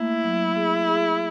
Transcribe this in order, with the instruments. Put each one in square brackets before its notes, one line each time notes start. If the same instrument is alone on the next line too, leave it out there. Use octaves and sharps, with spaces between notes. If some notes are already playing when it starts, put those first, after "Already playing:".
Already playing: [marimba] A3 A#3 [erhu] E4
[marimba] F#3
G#4
G#4